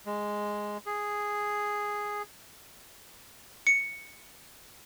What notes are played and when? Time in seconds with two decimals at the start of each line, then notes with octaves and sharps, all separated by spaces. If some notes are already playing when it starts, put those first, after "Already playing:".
0.06 G#3
0.86 G#4
3.67 C#7